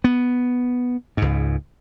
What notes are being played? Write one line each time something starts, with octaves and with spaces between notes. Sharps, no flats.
B3
C#2 G#2